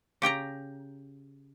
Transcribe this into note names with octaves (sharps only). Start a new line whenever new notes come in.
C#3 G4 G5 A#5